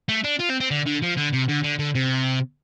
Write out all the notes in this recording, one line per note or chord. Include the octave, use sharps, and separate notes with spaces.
A3
D4
F4
C4
C4
D3
D3
F3
D3
C3
D3
D3
D3
C3